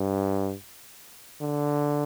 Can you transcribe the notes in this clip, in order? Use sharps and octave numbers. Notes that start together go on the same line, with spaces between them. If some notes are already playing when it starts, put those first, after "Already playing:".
Already playing: G2
D3